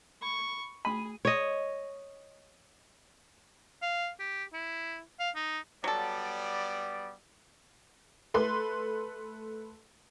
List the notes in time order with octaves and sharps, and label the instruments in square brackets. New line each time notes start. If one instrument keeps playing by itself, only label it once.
[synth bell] B5 [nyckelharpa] C#6
[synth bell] A3 D#7 [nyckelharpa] G#4 [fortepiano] B5
[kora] C#5 D#5
[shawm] F5
G4
E4
F5
D#4
[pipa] F#3 A4 [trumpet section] G3 B3 D5
[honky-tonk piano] A3 B4 C6